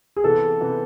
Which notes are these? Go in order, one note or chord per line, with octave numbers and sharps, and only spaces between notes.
G#4
C3 E3 B3 A4
C3 E3 B3